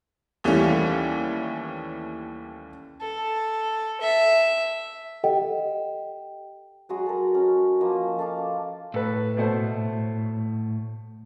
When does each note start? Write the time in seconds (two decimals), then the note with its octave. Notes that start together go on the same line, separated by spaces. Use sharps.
0.44 D#2 E3 G3 A3 C#4
3.01 A4
4.01 E5
5.24 G4 A4 D#5 F#5 G5
6.89 F#3 G#3 F#4 G#4
7.06 A4 A#4
7.34 C#4
7.81 F3 A#3 D#5
8.19 A4 F5 D6
8.94 A2 A4 B4
9.37 B2 A3 C5